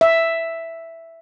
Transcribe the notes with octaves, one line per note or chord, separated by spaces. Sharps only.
E5